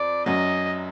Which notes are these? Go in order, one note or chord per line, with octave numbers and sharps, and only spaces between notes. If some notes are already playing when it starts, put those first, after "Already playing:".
Already playing: F2 D5
F#2 F#3 D#5